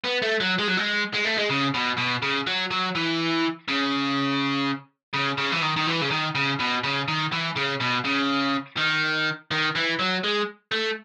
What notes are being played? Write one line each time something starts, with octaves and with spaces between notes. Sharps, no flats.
B3
A3
F#3
G#3
F#3
G#3
G#3
A3
G#3
C#3
B2
B2
C#3
F#3
F#3
E3
C#3
C#3
C#3
E3
D#3
D#3
E3
C#3
D#3
C#3
B2
C#3
D#3
E3
C#3
B2
C#3
D#3
D#3
E3
F#3
G#3
A3